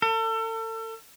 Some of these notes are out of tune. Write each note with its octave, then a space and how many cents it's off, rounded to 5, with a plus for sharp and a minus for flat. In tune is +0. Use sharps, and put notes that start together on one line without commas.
A4 +35